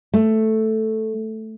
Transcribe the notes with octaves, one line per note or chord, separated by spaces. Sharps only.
A3